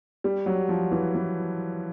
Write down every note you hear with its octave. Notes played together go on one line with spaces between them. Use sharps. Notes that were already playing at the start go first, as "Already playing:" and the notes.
G3
F#3
F3
E3
E3